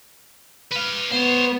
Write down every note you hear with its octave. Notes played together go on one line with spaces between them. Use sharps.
B4 F5
B3 C5 C#5